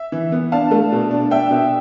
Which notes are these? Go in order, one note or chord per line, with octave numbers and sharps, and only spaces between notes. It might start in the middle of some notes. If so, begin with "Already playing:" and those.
Already playing: E5
E3
B3
D4 F5 A5
A3
B2
D4
D4 E5 G5
B2